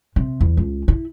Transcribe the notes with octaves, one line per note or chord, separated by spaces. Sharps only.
C3
E2
C#2
E4